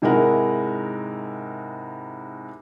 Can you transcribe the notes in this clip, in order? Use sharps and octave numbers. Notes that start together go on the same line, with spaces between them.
G#2 C3 G#3 E4 A#4 F#5